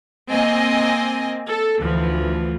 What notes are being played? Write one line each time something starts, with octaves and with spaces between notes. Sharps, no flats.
A#3 C4 D#5 G#5
A4
D2 E3 F3